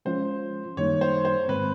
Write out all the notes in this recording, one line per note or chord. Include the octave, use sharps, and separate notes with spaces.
F3 G#3 C#4 F4 C5
F#2 D#3 G3 A#3 D#4 C#5
C5
C5
G#2 D#3 G#3 C4 B4